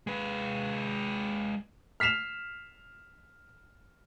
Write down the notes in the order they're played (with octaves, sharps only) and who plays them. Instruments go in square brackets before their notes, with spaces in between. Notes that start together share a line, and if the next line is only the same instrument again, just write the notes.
[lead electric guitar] G#3 B4
[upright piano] F6 B6 C7 E7 F7